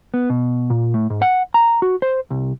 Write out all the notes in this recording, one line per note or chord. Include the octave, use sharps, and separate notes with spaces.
B3
B2
A#2
A2
G#2
F#5
A#5
F#4
C5
C2